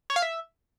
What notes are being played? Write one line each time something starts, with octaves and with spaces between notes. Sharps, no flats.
C#5
F5
E5